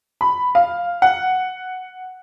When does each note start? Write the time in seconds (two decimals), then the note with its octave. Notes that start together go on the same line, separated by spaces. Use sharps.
0.21 B5
0.55 F5
1.02 F#5